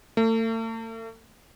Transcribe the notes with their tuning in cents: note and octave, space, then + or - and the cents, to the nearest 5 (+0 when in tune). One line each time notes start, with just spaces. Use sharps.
A3 +40